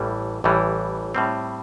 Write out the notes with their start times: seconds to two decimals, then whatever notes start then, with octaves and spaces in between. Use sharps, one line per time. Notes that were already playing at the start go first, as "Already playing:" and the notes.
Already playing: A1 A2 E3 G3
0.44 A1 A2 E3 G3
1.15 A2 G3 C4